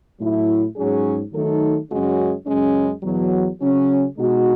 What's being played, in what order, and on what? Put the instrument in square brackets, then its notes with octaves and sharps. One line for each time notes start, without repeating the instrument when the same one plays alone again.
[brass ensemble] A2 F#3 A3 E4
G#2 F#3 C#4 G#4
D#3 F#3 A3 D#4 A4
F#2 C#3 G#3 C#4 F#4
F#2 C#3 G#3 C#4
E2 B2 F#3
C#3 F#3 C#4
B2 G#3 D#4 F#4